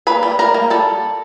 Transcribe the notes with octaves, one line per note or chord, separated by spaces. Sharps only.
A#3 B4 B5
G3
G3 A#4 A#5
A#3
G3 A4 A5